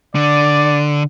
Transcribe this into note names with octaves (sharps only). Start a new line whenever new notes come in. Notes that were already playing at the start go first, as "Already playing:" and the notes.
D3 D5